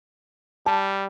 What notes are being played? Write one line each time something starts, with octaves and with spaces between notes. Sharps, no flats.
G3 A5